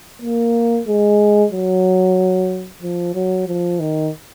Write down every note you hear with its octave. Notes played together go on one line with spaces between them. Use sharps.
A#3
G#3
F#3
F3
F#3
F3
D#3